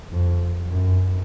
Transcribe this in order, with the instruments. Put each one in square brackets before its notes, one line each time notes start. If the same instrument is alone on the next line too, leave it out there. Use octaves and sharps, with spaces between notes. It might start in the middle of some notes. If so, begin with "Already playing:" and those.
[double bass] F2
F#2